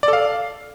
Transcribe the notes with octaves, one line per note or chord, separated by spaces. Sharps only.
D5
A4
F5